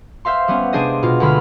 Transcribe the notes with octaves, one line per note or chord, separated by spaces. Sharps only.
C5 E5 F5 C6
G3 B3 C#4
C3 G#3 D4 G#4 C5 D#5
B2 F4
D2 D3 G#3 B5 F6